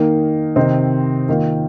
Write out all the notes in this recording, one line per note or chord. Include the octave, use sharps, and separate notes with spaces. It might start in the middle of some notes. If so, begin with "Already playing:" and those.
Already playing: D#3 A#3 D#4
C3 D#3 C4 D#4
D#3 A#3 F4